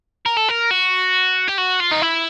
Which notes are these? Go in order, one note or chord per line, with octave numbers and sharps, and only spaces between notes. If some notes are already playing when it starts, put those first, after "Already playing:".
A#4
A4
A#4
F#4
G4
F#4
F4
D#4
E4